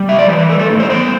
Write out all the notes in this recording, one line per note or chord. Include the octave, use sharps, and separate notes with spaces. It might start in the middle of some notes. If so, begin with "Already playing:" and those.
Already playing: G3
C3 E5
D5
E3 C5
B4
G3 A4
A4
A2
C5
B3 C5